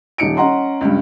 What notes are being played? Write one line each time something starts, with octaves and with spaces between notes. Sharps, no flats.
D#1 D#4 C#7 D7
C#4 D#5 F#5 A#5 C6
C#2 G2